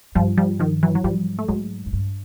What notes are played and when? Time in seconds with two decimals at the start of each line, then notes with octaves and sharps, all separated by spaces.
0.15 G2 F3 G3
0.37 F3 G3
0.59 D#3 F3
0.83 E3 F#3
0.95 F#3
1.04 G#2 F3 G3
1.39 A3
1.48 G#2 F#3 G#3
1.86 G#2
1.93 G2